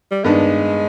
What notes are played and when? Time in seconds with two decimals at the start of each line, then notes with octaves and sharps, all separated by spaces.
0.11 G3
0.24 G2 D#3 G#3 B3 D4